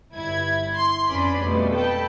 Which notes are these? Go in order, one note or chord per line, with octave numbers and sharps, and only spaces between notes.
G1 E4 G#6
C6
F2 C#4 D4 B4 B5 D6
F2 B2 F3 G3 A3
A4 G5 A5 B5